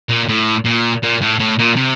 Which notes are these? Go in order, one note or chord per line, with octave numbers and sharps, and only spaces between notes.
A#2
A2
A#2
A#2
A2
A2
A#2
C3